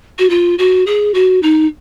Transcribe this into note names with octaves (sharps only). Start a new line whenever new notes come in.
F#4
F4
F#4
G#4
F#4
D#4